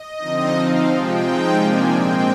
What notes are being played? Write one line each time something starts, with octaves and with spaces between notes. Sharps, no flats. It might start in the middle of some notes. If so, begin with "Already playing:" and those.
Already playing: D#5
D3 F3 C4 D#4
F3 C4 D#4 F5
C3 F3 G#3 G5
F3 G#3 C4 D#4
C3 F3 A#3 D4 G#5
A#2 G#3 C4 G5